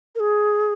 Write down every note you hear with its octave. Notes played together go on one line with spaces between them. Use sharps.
A#4
G#4